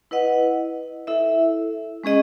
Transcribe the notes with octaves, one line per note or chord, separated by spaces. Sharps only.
E4 B4 D#5 F#5
E4 A4 E5
G#3 C#4 G#4 D#5